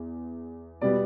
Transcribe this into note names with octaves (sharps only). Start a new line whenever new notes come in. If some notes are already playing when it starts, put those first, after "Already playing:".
Already playing: E2
B2 G3 B3 D5